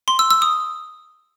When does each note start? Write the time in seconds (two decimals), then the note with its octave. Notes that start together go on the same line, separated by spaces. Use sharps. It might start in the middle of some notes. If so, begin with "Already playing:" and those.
0.08 C6
0.19 E6
0.31 E6
0.42 D#6